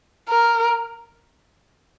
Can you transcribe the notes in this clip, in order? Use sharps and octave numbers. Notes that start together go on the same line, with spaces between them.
A#4